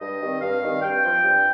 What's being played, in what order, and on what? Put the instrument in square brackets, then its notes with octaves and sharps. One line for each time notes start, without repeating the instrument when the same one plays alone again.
[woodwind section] G2 D#5
D#3 G3 C4
G2 F5
D#3 G3 C4
G2 G5
F3 C4
G2